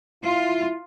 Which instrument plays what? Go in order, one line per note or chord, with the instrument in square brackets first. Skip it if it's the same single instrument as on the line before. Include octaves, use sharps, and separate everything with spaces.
[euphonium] E4 [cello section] F4